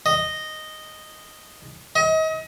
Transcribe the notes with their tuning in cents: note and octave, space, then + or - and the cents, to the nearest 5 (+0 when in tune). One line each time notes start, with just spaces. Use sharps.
D#5 -5
D#5 +35